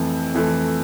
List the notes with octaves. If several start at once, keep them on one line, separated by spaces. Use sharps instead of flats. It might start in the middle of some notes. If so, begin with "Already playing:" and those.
Already playing: F2 E3 A3
F2 E3 A3